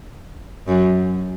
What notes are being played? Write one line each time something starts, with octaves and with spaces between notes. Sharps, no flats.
F#2